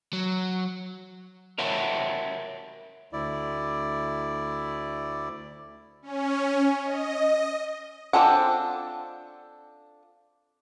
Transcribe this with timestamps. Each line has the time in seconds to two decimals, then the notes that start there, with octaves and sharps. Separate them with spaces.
0.13 F#3
1.58 A#4 C#5 E5 F#5 G5 A5
3.13 D2 E4 D5
6.02 C#4
6.83 D#5
8.13 C4 D4 F4 A4 F#5